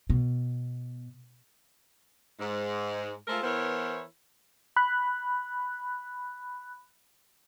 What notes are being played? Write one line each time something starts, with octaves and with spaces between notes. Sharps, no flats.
B2
G#2
G#3 A3 F4 A4 A#4 C5
E3 B3 E4 A#4 C5 C#5
B5 F#6